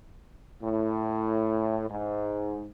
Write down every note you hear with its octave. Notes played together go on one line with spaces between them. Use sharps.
A2
G#2